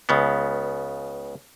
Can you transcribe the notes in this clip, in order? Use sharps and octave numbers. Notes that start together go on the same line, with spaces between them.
C#2 C#3 B3